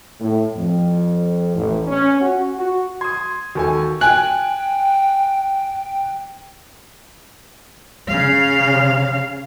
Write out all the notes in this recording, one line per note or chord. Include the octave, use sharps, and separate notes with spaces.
A2
F2
A1
C#4
F#4
F#4
C6 D#6 G#6
D#2 F#4 A4 G#5
G5 G#5 F#6
C#3 F5